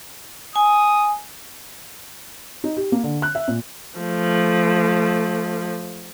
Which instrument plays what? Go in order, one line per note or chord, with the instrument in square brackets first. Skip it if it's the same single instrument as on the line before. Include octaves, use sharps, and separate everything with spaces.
[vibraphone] G#5 [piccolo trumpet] D#6
[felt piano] D#4
G4
A#3
D3
F#6
E5
A#2
[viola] F3 A3